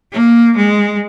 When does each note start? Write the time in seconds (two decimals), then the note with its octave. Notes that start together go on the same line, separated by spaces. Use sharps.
0.12 A#3
0.57 G#3